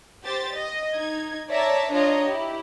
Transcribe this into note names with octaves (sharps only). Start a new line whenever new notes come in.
G4 C5 A6
D#5
D#4 G#6
C#5 D5 E5 A5 A#5
D4 F4 C#5 D#5 A#5
E4 G4